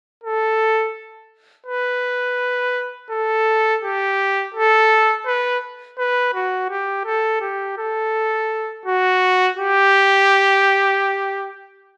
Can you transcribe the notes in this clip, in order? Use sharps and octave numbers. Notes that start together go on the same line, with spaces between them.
A4
B4
A4
G4
A4
B4
B4
F#4
G4
A4
G4
A4
F#4
G4